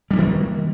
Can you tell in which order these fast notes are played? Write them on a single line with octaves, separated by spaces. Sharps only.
G3 C#4 A#3 D#3